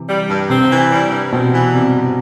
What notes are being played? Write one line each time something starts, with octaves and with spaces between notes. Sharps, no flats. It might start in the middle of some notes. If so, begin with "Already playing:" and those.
Already playing: C3 E3
G3
G2
C3 C4
E3
G3
G2
B2 C4
E3
C3 G3
G2